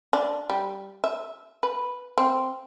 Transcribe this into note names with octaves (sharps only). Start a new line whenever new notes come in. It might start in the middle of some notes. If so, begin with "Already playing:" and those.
D4
G3
E5
B4
C4